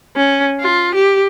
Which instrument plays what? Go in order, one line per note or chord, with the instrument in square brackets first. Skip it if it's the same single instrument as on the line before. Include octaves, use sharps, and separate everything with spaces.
[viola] C#4
F4
G4